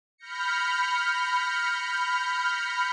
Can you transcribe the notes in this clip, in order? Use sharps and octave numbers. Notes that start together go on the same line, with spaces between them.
B5 F6 G6 A#6 C#7